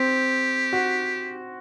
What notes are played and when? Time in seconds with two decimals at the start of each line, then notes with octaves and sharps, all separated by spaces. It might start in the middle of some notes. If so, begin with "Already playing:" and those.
Already playing: C4 G4
0.73 F#4